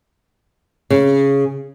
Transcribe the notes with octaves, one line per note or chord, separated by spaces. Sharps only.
C#3